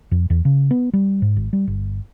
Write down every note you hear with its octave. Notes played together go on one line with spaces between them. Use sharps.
F2
E2
C#3
B3
G3
G#2
G#1
G3
G1